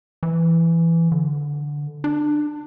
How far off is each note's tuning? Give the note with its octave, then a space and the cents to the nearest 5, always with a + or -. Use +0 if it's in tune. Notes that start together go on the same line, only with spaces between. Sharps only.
E3 +15
D3 -5
D4 +25